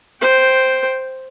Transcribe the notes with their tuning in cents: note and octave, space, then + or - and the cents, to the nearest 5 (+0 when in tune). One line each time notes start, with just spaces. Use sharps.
C5 +0 G5 -5